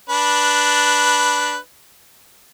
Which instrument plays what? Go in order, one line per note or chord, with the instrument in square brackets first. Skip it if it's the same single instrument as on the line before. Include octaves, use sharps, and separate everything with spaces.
[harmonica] D4 B4